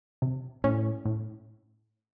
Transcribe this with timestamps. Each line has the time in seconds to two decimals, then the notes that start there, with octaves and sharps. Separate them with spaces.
0.22 C3
0.64 A2 C#4
1.05 A2